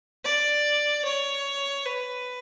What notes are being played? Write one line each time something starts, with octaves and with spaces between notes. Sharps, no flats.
D5
C#5
B4